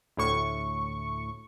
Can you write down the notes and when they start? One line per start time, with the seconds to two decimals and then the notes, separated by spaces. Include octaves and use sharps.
0.17 D2 A2 C#6